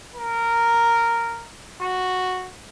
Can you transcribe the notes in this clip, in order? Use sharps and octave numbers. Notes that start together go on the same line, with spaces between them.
A#4
F#4